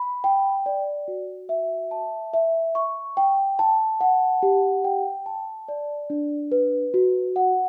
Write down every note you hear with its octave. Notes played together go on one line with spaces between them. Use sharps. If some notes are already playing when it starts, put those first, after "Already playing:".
Already playing: B5
G5
D5
F#4
E5
A5
E5
C#6
G5
A5
F#5
G4
G5
A5
D5
D4
B4
F#4
F#5